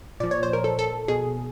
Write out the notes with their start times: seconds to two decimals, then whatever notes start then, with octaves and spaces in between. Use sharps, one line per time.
0.20 A#2 F3 D5
0.31 C#5
0.43 C5
0.53 A#4
0.64 A4
0.79 A4
1.08 B2 G#4